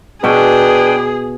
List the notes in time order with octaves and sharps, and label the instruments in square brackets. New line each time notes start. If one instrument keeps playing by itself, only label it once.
[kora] B2 F#4 [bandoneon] D4 G5 [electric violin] G#4 [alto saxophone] B4